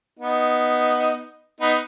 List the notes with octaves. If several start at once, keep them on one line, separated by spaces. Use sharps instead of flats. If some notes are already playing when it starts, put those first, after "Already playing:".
B3 D#4
B3 D#4